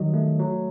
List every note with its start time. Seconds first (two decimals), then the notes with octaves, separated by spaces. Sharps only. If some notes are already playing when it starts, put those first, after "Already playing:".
Already playing: D#3 F#3 G3 C#5 D#5
0.14 A3
0.40 F#3